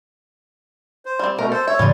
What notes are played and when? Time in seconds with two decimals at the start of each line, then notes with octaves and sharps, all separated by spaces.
1.06 C5
1.19 G3 C4
1.39 B2 A3 A#4
1.52 A4 C5
1.68 C#5 E5
1.79 G#2 C#3 E3 G3 F4 D5